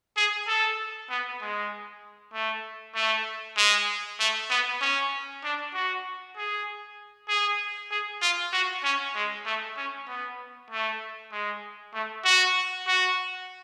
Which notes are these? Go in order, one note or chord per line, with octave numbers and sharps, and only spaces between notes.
G#4
A4
B3
G#3
A3
A3
G#3
A3
B3
C#4
D4
F#4
G#4
G#4
G#4
F4
F#4
C#4
G#3
A3
C#4
B3
A3
G#3
A3
F#4
F#4